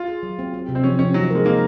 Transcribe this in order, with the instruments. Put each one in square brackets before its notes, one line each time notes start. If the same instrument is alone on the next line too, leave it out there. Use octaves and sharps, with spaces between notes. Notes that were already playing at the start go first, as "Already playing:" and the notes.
Already playing: [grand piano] F4
[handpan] G#4
F#3
C4
C4
C3
[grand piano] C4
[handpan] F3 [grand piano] C#4
[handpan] F3 [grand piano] C#4
[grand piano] F#3 [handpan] D#4
[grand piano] G#3 [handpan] A#4
[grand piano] A#3 [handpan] D#4